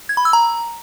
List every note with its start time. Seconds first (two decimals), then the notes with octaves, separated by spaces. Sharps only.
0.09 G#6
0.17 B5
0.25 E6
0.33 A#5